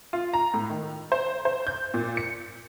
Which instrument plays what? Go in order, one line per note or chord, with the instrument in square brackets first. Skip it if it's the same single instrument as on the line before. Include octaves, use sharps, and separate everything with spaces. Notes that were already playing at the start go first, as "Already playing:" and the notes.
[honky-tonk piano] F4
A#5
A2
D#3
C5
C5
G6
A#2
C#7